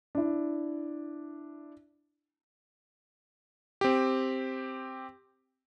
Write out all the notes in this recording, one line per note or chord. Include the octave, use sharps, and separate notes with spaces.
D4 E4
C4 G4